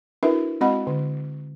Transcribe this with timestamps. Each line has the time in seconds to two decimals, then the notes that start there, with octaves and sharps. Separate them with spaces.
0.23 D4 E4 F#4 A#4 B4 E5
0.61 G#3 C4 F#4 D#5 F#5 B5
0.87 D3